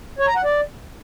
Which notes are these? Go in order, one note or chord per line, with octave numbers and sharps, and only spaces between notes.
C#5
A#5
F#5
D5